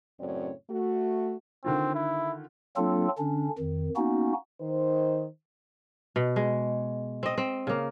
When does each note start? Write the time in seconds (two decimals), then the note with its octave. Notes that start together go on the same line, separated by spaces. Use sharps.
0.21 F#2 A2 C#3 C4 C#5 D5
0.70 A3 F#4
1.64 D3 D#3 C4 F4
1.95 E4
2.77 F#3 A#3 C4 D4 F4 A4
3.18 D3 C#4 D4
3.59 F2 D#3
3.96 A#3 B3 C#4 D#4 F#4
4.61 D#3 C5
6.16 B2
6.36 G#3
7.23 C4 D#5
7.38 C4
7.67 C#3 A#3